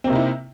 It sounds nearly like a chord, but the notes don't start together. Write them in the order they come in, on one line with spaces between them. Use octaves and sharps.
C4 A#3 C3 D#4 E4